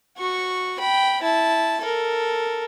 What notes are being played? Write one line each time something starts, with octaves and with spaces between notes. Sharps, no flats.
F#4 C#6
G5 B5
E4 A5
A4 A#4